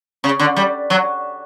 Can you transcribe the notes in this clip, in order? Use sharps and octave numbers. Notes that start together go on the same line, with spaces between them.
C#3
D3
G3
F#3